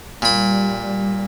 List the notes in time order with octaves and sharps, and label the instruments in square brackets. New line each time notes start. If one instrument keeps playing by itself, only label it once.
[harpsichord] A#2 B5 [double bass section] G3